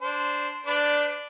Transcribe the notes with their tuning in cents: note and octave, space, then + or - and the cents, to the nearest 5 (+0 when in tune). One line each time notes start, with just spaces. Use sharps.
D4 -15 C5 -10
D4 +0 B4 +45 D5 +0